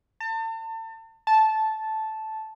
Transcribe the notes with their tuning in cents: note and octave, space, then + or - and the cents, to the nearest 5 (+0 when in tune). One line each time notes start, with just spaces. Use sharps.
A5 +35
A5 -10